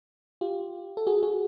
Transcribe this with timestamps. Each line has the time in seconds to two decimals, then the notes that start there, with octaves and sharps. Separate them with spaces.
0.41 F4 G4
0.97 A4
1.07 F#4 G#4
1.23 F#4 G#4